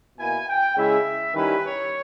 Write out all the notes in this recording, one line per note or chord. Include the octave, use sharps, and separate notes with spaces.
B2 A#3 E4 G#5
G5
C#3 G#3 C#4 E4 E5
D#3 G3 C#4 E4 B4
C#5